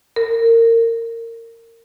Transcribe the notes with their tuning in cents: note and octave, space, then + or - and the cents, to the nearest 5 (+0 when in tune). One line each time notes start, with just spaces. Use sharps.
A#4 -25